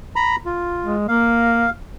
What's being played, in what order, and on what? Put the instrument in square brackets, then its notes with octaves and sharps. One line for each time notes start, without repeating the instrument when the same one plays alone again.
[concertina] A#5 B5
F4
[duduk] G#3
[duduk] A#3 [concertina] F5